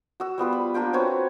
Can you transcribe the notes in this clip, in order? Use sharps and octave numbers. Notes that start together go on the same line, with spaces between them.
F#4 E6
G3 B3 F4 B4
B5
A#3 D4 F4 G5
C4 F#4 B4 C#5